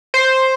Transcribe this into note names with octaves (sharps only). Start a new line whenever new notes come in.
C5